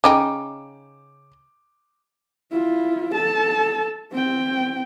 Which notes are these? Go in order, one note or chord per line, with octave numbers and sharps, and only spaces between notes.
C#3 D#4 G5 D6
E4 F4
A4 A5
C4 G5